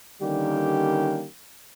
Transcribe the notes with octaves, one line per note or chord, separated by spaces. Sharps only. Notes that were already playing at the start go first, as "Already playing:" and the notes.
D3 D#3 G3 A#3 C#4 G4